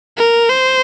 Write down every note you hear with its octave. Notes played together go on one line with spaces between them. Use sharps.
A#4
C5